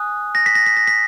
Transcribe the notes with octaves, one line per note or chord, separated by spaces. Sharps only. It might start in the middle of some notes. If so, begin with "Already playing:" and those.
Already playing: G#5 D#6 F#6
A#6
B6
A#6
B6
A#6
B6